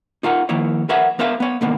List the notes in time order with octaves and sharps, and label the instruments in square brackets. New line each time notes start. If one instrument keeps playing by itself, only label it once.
[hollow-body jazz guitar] D#4 F4 A#4 F#5
D#3 F3 A#3 E4 C#5
A#4 B4 C#5 E5 F#5
B3 A#4 C5 E5 F5
B3 C#5
C2 G#2 D#3 A#3 B3